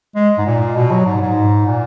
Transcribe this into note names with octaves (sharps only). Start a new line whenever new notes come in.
G#3
G#2
A#2
B2
F#3
G#2
G#2
A#2